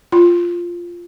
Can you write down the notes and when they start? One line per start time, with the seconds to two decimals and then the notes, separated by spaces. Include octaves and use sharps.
0.12 F4